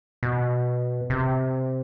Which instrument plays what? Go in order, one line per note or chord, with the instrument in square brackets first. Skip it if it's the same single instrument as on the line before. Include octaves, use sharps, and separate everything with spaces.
[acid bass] B2
C3